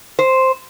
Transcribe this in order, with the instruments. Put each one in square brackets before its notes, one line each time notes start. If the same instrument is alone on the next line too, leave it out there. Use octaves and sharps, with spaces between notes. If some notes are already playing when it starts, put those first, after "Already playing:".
[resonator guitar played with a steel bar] C5